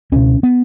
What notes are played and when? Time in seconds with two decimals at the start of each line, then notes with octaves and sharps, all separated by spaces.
0.12 C#2 B2 C#4
0.43 B3